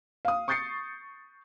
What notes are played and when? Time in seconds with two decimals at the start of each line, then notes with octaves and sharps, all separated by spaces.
0.25 F5 D#6
0.48 C#6 D#6 G6 A6 C7 C#7